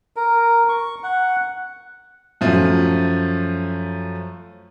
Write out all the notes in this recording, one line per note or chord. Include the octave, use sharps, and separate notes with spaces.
A#4
C#6
F#5
F#2 F3 A3